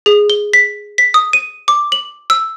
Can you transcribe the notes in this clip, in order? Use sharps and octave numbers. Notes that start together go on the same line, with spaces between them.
G#4
G7
B6
B6
D#6
D#7
D6
F#7
E6